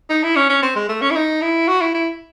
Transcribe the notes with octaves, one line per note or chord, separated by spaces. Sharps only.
D#4
E4
C#4
C#4
C4
G#3
A3
C#4
E4
D#4
E4
F#4
E4
E4